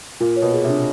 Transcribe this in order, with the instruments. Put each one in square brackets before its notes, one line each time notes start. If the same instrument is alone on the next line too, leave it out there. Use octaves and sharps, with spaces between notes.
[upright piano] A#2 [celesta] F4
[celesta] C#5
[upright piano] B2
[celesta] G#4
[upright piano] C3
[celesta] D4